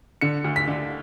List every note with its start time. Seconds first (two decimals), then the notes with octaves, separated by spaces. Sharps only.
0.21 D3 C#7
0.44 D2
0.56 B6
0.68 D3